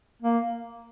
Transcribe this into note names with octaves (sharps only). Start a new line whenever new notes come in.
A#3